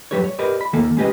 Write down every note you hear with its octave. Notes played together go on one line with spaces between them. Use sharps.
F#3 G3 G4 B4 C#5
C#5
G4 A#4 B4 D5 D#5
B5
D#3 A#3 A4
G#3 C#4 G4 B4 D#5